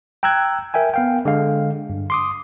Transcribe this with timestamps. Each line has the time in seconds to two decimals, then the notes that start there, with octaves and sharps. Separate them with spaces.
0.23 G5 A#5 E6 F#6 G#6
0.74 A#4 E5 G5 G#5
0.94 B3 F5 G5
1.25 D3 G#3 F5
1.90 G2
2.10 C6 D6 D#6